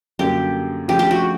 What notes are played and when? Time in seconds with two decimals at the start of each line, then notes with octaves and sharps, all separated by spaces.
0.19 F#2 D3 G3 A#3 G4
0.88 C#3 F3 A3 D4 G4
0.99 G4
1.11 F#4